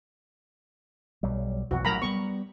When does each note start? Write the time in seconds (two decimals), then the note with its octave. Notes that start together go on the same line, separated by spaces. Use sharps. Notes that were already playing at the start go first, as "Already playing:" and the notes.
1.23 B1 F#3 G3
1.71 B1 F2 E3 F#4
1.85 A1 F#3 A#4 A#5 B5
2.02 G3 G#3 B3 C#6